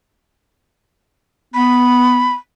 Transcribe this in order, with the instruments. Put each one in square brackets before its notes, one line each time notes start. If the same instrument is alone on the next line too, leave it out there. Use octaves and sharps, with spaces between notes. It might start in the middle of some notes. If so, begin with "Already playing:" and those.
[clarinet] B3 [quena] B5